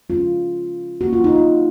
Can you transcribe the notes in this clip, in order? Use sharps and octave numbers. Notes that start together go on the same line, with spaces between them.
C#3 G#3 C#4 F4
D#3 A#3 C#4 F#4
F4
D#4
F4